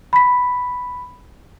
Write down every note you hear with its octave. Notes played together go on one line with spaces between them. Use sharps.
B5 B6